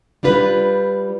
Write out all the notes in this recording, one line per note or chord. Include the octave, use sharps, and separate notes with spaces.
G3 D4 F4 B4